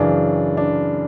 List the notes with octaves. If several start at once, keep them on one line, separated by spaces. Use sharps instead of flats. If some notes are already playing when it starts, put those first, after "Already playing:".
Already playing: F#2 C#3 E3 D4
D4